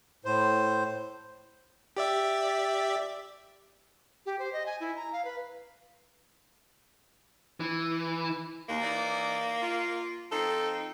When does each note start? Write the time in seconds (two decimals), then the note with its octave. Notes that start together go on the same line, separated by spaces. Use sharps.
0.25 A2 C5
1.97 G4 D5 E5
4.26 G4
4.39 C5
4.53 D#5
4.66 G#5
4.80 E4
4.96 A#5
5.13 F5
5.25 B4
7.60 E3
8.69 D#2 A#3
8.81 E3 D#4 D5
9.62 F4
10.31 F3 C4 D#4 A4